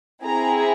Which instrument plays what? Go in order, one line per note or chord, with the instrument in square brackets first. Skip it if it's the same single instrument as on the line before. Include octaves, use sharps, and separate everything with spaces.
[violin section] C4 E4 G#4 A#5